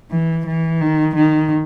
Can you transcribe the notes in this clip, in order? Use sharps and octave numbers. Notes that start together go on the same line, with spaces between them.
E3
E3
D#3
D#3